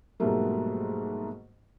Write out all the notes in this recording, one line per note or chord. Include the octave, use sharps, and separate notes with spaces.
G#2 B2 F#3 G3 A3 A#3